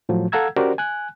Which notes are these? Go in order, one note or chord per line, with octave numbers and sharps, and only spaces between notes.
A2 F3 F#3
A4 F5 F#5 A#5 E6 G#6
C#4 F#4 G4 A#4 C5 D5
G#5 F#6